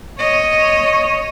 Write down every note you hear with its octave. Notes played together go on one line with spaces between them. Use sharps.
C#5 D#5